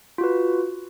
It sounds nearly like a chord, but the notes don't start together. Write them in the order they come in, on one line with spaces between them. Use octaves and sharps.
F4 F#4 B4